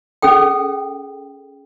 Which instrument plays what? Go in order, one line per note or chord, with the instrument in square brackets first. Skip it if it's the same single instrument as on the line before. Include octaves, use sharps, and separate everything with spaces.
[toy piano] C#4 G#4 A4 G5